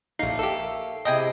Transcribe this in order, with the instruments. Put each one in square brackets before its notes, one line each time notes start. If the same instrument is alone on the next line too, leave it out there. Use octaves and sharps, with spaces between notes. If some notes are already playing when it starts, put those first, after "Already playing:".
[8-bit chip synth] A#1 D#4 [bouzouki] A3 A#3 [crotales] C7
[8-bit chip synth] G4 A4
[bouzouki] C3 G#3 E4 [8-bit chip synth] D#5 G5 G#5